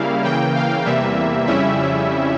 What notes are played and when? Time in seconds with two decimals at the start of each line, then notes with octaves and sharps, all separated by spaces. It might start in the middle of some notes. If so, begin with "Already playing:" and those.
Already playing: C#3 G3 A#3 E4 F5
0.24 C#3 E3 A#3 G5
0.55 F5
0.85 E2 C3 E3 G3 A#3 E5
1.47 F2 C#3 G3 C#4 E4 E5